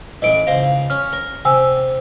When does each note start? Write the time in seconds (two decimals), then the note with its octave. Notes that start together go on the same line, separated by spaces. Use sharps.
0.22 A1 E3 D#5 D7
0.47 C#2 C5 F5 A#5
0.90 C#4 F6
1.13 A#4
1.45 C3 G5 G#5 E6